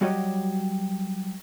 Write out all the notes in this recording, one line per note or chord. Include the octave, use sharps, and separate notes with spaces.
F#3 G3 F#4 G4 C#5 D#5